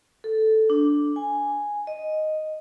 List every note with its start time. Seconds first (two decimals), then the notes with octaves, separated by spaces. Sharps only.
0.24 A4
0.70 D4
1.16 G#5
1.87 D#5